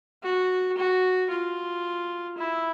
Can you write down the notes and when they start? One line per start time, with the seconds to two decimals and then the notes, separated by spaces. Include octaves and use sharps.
0.23 F#4
0.77 F#4
1.31 F4
2.38 E4